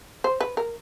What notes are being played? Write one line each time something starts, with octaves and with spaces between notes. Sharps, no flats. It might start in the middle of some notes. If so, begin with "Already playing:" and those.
C5
B4
A#4